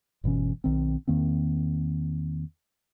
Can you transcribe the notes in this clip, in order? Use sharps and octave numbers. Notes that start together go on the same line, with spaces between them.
G1 B2 E3 C#4
B1 D#3 C4
E2 D#3 A#3 C4